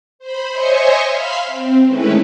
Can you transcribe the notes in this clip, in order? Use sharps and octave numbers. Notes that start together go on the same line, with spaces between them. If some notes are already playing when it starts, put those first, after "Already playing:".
C5 B5
C5 C#5 D#5 E5 G#5 C#6
E5 F5 B5 C6 F6 B6
C4
D#3 G#3 A3 C#4 E4 B4